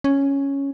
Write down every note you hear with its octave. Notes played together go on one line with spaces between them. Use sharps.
C#4